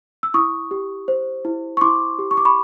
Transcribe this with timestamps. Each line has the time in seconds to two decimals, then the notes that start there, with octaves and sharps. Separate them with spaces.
0.23 E6
0.34 E4 C#6 D#6
0.71 G4
1.08 C5
1.45 E4
1.77 C#6
1.81 E4 C6 D6
2.19 G4
2.31 C#6
2.37 D6
2.45 B5 C#6